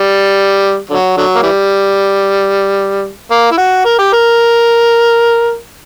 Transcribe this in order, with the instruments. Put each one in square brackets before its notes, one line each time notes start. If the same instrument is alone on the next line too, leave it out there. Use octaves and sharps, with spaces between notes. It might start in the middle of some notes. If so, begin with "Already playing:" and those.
Already playing: [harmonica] G3
D3 F#3
D3 F#3
A#3
E3 G3
A#3
E4
F#4
A#4
G4
A#4